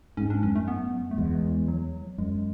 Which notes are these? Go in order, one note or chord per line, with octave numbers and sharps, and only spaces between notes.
G#2 C#4
D4
F#2 C#4
A3
B3
A3
E2 G#3
F#3
F#2 G#3